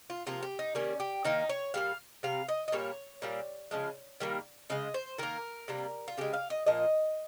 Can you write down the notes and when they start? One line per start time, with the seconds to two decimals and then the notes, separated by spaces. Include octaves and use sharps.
0.10 F4
0.27 C3 F3 A#3 F4
0.42 G4
0.59 D#4
0.75 D#3 G3 A#3 C#4
1.00 G4
1.25 D#3 A#3 D#4
1.49 C#5
1.74 A#2 G3 A#3 F5
2.23 C3 G3 F5
2.48 D#5
2.68 D#5
2.72 A#2 G3 A#3 C#5
3.22 A#2 G3 A#3
3.71 C#3 F3 G#3
4.20 D#3 G3 A#3
4.70 C#3 G#3 D#5
4.94 C5
5.18 D#3 A#3 A#4
5.68 C3 G3 A#3
6.08 F4
6.17 C#3 G#3 G4
6.33 F5
6.50 D#5
6.66 A#2 F3 A#3 D#5